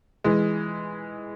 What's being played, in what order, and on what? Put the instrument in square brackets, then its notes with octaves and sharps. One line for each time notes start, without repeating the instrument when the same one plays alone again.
[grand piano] E3 G#3